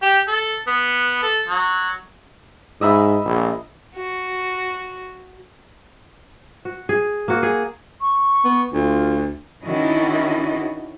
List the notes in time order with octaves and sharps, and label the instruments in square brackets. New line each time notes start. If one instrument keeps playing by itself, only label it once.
[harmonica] G4
A4
B3
A4
F#3
[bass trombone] G#2 [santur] D#5 E5 B5
[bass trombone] A#1
[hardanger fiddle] F#4
[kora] F#4
G#4
A#3 F#4
G#4
[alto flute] C#6
[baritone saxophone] B3
[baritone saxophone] D2 [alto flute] F4
[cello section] D#3 C#4 D4 E4 F#4 D#5